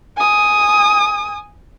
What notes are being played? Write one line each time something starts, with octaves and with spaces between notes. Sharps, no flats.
G#5 D#6